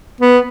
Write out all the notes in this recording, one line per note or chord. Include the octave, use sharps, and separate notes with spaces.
B3